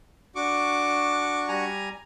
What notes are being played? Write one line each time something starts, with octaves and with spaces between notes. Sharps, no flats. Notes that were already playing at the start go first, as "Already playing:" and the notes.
D4 F#4 C#6 D6
G3 G#5 A#5